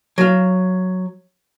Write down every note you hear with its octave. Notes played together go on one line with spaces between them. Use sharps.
F#3 F5